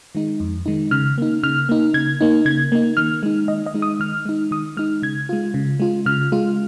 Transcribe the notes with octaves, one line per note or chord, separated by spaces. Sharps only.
D#3 G#3 D#4
F2
D#3 G#3 D#4
C#3 F6
A#3 D#4
C#3 F6
A#3 D#4
C#3 G#6
A#3 D#4
C#3 G#6
A#3 D#4
D#3 F6
G#3 D#4
D#3 D#5
D#5
G#3 D#4
D#6
D#3 F6
G#3 D#4
D#3 D#6
G#3 D#4 F6
C#3 G#6
G#3 F4
C#3
G#3 F4
C#3 F6
G#3 F4